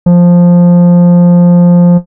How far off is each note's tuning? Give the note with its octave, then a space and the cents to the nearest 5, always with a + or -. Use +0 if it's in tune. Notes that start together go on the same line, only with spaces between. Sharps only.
F3 +5